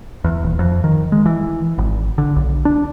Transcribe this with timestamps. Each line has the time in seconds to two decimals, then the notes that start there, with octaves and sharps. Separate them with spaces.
0.24 E2
0.43 D#1
0.59 F2
0.84 D#3
1.12 G#3
1.26 E3
1.78 G#1
2.18 D3
2.36 B1
2.65 D4